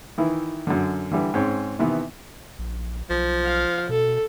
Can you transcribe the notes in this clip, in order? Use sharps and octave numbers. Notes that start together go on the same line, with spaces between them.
D#3 E3 E4
F#2 D3
D3 E3 G3
G#2 C4 C#4
C3 D#3 E3 B3
A#1
B1 F3
F5
B2 A4